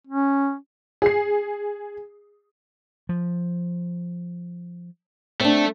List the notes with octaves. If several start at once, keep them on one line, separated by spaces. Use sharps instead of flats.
C#4
G#4 C7
F3
A3 C4 D4